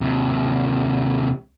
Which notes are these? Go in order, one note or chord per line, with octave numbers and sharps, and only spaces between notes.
D#2 C3